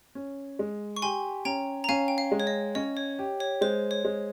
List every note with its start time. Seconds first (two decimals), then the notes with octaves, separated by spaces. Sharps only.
0.15 C#4
0.59 G#3
0.96 C#6
1.02 G4 G#5 C6
1.45 C#4 G5 A#5
1.84 A#5
1.89 C#4 F5 G#5
2.08 G5
2.18 F5
2.32 G#3
2.40 C#5
2.47 D#5
2.75 C#4 D#5
2.97 C#5
3.19 G4
3.40 C#5
3.61 G#3 C5
3.91 C#5
4.05 G#3